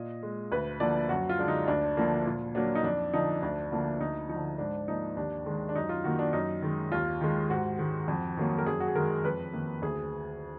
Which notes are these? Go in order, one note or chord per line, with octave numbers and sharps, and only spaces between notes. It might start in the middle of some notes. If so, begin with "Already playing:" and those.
Already playing: A#2 D#5
G#3
D2 B4
D3 F3 A#3 D5
F#2 F#4
F4
D3 G#3 D4
D#4
D2 D4
D3 F3 A#3
A#2
F#3 A#3 D4
D#4
F2 D4
D3 F3 D#4
D2 D4
D3 F3 A#3
D2 D#4
F3 D#4
D3
G#2 D4
F3 A#3 D#4
D#2 D4
D#3 G#3
D4
F#2 D#4
F4
D#3 A#3 F#4
D4
F#2 D#4
D#3 G#3
D#2 F4
D#3 G#3
G#2 F#4
D#3 G#3
F2
D#3 F#3 A#3
A#4
F#2 G#4
F#4
G#4
D#3 G#3 A#4
F2 B4
D#3 A#3
D2 G#4